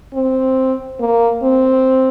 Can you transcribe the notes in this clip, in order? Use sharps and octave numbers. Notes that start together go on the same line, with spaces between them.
C4
A#3
C4